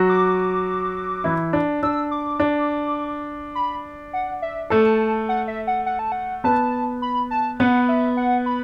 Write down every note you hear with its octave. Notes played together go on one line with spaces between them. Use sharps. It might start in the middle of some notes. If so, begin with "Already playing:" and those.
Already playing: F#3 F#4
D6
E3 E4
D4
D4 E6
D6
D4
B5
F#5
E5
A3 A4 A5
F#5
E5
F#5
F#5
A5
F#5
B3 B4 A5
B5
A5
B3 B4 F#5
E5
F#5
B5